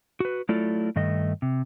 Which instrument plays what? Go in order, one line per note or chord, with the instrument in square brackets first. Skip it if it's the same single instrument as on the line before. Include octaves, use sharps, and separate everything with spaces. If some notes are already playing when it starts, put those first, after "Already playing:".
[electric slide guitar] F#4 B4
F#3 A3 E4 F4 A4 D5
G2 D#3 A3 D#5
C3